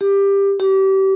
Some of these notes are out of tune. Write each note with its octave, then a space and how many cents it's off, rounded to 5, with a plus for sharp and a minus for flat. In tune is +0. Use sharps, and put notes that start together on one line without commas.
G4 +15
G4 -30